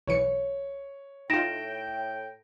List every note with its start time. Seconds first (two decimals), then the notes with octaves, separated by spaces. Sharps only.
0.07 B1 E3 C#5 C#7
1.30 A2 D#4 F4 G5 A#6 D7 E7